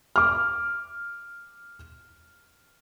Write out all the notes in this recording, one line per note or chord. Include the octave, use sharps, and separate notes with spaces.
D6 F6